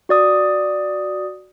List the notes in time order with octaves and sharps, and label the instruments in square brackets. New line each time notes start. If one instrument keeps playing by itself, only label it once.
[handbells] F#4 D5 D#6